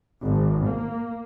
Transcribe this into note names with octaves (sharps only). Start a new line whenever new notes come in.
G#1
A#3